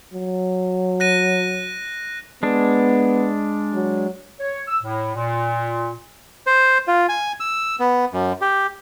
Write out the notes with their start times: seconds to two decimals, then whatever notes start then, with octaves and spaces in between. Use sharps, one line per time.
0.13 F#3
1.00 F#6 A#6 D#7
2.43 G#3 B3 D4
3.73 F#3
4.40 C#5
4.68 E6
4.82 A2
5.15 A#2
6.47 C5
6.88 F4
7.09 G#5
7.40 E6
7.80 B3
8.13 F#2
8.42 G4